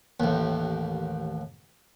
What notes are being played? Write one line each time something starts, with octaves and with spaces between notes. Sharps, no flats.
A1 D#2